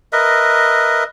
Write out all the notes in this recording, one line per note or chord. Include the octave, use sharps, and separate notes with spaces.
A#4 B4 D#5 E5